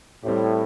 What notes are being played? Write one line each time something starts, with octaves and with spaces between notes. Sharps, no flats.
A2 G3 C4 G4